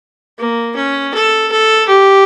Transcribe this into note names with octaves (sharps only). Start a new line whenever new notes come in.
A#3
C#4
A4
A4
G4